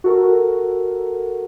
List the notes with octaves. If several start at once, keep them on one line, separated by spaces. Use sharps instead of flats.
F#4 A4 A#4